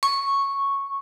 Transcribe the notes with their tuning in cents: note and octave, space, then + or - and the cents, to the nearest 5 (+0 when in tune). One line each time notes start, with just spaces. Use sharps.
C#6 -5